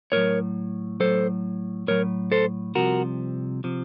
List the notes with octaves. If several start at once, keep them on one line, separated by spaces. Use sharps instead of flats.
A2 F#3 A#4 C#5
A2 F#3 A4 C5
A2 F#3 A#4 C#5
A4 C5
C2 C3 F3 F#4 A#4
C3 F3